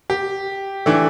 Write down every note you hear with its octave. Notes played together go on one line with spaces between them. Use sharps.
G4
E3 A3 D4